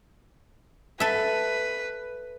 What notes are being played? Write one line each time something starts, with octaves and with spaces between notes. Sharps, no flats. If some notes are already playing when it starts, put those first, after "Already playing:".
A4 B4 E5